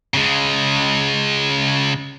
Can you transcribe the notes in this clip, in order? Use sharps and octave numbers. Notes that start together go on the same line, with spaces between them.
C#3 G#3